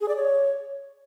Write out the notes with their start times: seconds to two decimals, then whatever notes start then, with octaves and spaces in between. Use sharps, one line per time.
0.01 G#4
0.08 D5
0.16 C#5